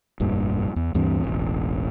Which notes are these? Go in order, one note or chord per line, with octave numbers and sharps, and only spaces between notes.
F1 C2 G2 A#2
E2
D2 G2 E3 C4
E1 A1